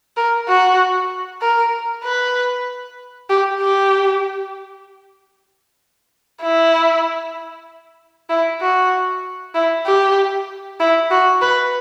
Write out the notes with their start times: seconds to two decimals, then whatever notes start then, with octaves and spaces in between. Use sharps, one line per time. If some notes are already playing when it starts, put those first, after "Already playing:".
0.17 A#4
0.48 F#4
1.42 A#4
2.04 B4
3.29 G4
3.61 G4
6.42 E4
8.29 E4
8.61 F#4
9.55 E4
9.86 G4
10.80 E4
11.11 F#4
11.42 B4